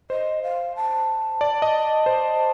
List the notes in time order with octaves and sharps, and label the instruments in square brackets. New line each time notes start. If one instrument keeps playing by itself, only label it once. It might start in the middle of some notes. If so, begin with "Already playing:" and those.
[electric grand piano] C5 [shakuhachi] D#5
[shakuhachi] F5
A5
[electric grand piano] D5
D#5
C5